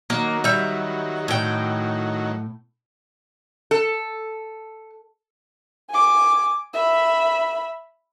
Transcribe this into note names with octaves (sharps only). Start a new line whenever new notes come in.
D#3 F#3 A#3
G3 E5
A2 G5
A4
G#5 D6
E5 B5